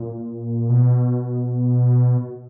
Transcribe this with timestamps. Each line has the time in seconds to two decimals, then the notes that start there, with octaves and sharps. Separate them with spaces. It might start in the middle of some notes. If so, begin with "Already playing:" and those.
Already playing: A#2
0.69 B2